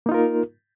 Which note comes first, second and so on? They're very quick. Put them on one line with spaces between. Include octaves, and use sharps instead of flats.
A#3 D#4 F4 A#4